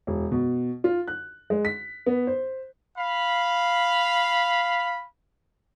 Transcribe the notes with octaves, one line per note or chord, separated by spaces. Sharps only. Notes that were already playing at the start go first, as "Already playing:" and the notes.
E1
B2
F4
F#6
G#3
B6
B3
C5
F5 B5